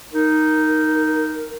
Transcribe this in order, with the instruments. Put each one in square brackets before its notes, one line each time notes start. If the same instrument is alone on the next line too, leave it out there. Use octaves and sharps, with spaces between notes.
[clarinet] D#4 [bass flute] A#4